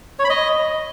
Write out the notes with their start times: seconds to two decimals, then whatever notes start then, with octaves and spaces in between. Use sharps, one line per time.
0.19 C#5
0.24 B5
0.30 D#5